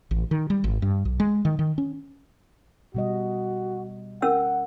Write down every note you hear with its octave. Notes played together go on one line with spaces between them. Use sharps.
A1
D#3
G3
G#1
G2
B1
G#3
D#3
D#3
C#4
B2 G3 F#4 D#5
C#4 A#4 F#5 E6